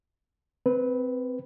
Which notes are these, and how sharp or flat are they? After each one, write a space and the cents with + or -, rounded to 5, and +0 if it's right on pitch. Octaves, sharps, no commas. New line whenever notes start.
C4 -20 B4 +0